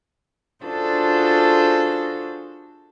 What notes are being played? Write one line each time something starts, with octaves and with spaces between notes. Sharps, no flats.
D4 F4 F#4 G#4 A4 C5